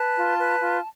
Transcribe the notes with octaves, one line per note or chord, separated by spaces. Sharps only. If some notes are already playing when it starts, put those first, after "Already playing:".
Already playing: B4 A5
F4
B4
F4